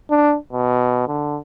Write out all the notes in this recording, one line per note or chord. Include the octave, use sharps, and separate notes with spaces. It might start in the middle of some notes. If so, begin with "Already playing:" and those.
D4
B2
D3